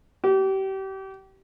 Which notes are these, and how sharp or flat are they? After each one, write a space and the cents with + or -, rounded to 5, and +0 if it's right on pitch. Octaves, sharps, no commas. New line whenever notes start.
G4 -30